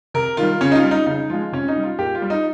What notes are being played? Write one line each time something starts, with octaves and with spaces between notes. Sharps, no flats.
C3 A#4
D#3 G3 F4
C#3 C#4
D#4
F4
G3
D#4
C#3 D#4
F3 G#3 F4
C3 C#4
D#4
G3
F4
A#2 G4
F4
G3
D#4